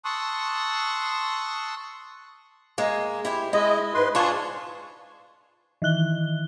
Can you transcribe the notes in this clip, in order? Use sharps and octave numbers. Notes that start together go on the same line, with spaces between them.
A5 C6 C#6 D#6 E6 F#6
G#3 A#3
E4 G4 C5
G#3 E4 D#5
G#2 B4 C6
D4 F4 G#4 A5 C6 C#6
D#3 E3 F#6 G7